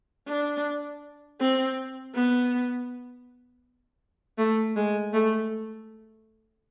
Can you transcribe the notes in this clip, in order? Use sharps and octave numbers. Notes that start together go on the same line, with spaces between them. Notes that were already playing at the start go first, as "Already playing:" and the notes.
D4
C4
B3
A3
G#3
A3